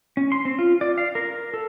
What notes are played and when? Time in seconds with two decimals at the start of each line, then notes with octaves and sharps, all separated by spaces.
0.17 C#4
0.32 C6
0.45 C4
0.59 F4
0.81 D5
0.98 F5
1.15 A#4
1.54 A4